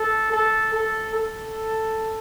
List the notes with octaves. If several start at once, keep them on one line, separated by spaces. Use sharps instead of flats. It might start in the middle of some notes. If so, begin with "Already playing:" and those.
Already playing: A4
A4
A4
A4